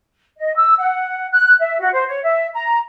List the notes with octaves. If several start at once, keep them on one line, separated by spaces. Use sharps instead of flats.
D#5
E6
F#5
F#6
E5
F#4
C5
C#5
E5
A#5